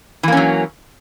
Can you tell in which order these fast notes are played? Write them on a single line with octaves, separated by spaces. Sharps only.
E3 A#3 C#4 F#3